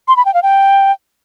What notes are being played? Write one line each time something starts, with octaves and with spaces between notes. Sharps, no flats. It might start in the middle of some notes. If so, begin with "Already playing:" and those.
C6
B5
G5
F5
G5